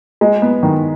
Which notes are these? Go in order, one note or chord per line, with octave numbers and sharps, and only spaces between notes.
G#3
B3
D#3